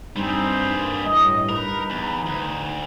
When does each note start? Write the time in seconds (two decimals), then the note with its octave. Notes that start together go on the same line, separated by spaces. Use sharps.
0.16 G2 G3 C4 D#4 G#4 C5
0.75 A#3
1.05 A2 D#5
1.49 D#4 A#4 B4
1.90 E2
2.26 D2